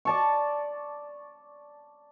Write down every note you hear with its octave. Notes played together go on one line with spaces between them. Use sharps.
D5 A5 C#6